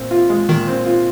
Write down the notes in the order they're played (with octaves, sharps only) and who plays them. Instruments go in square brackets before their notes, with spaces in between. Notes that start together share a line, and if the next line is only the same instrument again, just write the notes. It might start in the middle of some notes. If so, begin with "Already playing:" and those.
Already playing: [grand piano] A#2 C4
F4
G#3
[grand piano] A#2 [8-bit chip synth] D#3
[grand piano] C4
F4